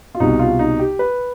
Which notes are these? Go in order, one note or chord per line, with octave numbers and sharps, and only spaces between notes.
F4
C2 B2 D#4
F4
D#4
G4
B4